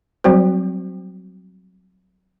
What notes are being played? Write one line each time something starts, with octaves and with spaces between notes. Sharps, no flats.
F#3 G3 C4 F#4 C5